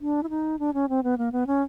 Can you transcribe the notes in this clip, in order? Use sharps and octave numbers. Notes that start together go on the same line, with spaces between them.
D4
E4
D#4
D4
C#4
C4
B3
A#3
B3
C#4